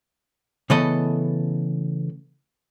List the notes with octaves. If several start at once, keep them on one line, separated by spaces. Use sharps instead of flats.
C#3 E3 A3 B3 A4 D#5